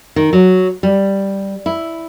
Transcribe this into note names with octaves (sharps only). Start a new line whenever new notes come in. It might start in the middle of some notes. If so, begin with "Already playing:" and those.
D#3
F#3
G3
E4